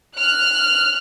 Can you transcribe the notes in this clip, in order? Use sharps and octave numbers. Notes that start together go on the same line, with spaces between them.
F6 F#6